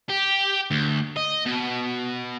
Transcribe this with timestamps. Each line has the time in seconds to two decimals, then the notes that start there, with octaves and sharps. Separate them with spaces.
0.09 G4
0.71 D2
1.17 D#5
1.46 B2